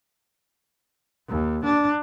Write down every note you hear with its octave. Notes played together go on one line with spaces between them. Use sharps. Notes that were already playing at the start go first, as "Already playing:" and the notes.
D#2
D4